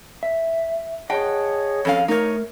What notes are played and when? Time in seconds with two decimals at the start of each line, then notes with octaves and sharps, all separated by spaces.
0.23 E5
1.10 G#4 C#5 D#5 F#5 G5 A5
1.85 F2 C#4 A4 F5
2.08 A3 D#4 A#4 C#5